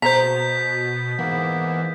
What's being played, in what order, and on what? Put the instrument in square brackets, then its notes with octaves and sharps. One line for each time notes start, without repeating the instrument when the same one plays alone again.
[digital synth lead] B2 [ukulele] C5 A#5 [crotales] G6 B6
[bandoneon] G#2 A#3 B3 [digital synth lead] E3